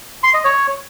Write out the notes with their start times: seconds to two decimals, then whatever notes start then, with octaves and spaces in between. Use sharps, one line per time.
0.23 C6
0.34 D#5
0.44 C#5